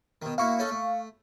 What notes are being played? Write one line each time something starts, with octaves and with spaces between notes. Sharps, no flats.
B2 D#3
A#3 E4 F#4 F5 C#6
C#4 D#4 A4
A3